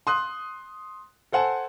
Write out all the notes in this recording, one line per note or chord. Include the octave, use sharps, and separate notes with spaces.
C6 D#6 F#6
A4 C5 F#5 G#5 A5